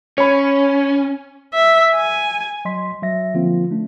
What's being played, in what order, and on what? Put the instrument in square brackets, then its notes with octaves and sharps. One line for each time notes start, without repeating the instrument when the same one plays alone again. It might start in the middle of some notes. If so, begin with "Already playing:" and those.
[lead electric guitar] C#4 [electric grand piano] C#5 B5
[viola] E5
G#5
[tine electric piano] F#3 D#5 C6 B6
F#3 E5 A#6
D3 F3 A#3 C4 F4
A3 D4